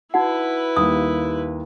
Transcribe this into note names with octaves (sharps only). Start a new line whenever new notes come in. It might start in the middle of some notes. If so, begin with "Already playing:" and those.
D#4 E4 F#4 B4 F#5
D#2 G3 A#3 D#6